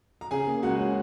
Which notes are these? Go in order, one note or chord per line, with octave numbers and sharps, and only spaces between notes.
A#5
C#3 G#4 G#5
A#3
C#2 F#4 F#5
C#4